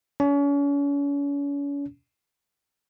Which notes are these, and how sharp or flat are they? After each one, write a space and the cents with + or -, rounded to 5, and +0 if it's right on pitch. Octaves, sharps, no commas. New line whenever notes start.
C#4 +40